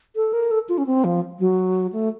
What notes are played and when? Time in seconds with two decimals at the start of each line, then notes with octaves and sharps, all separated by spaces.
0.16 A4
0.33 A#4
0.51 A4
0.69 F4
0.78 C#4
0.86 C4
1.04 F3
1.39 F#3
1.93 A3